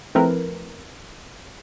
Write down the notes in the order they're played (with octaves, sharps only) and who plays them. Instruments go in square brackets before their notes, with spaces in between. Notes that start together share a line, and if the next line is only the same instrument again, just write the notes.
[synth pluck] F3 A3 C4 E4 A#4 B4